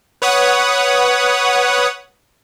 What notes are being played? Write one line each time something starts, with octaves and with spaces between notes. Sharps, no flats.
B4 C#5 F#5 D#6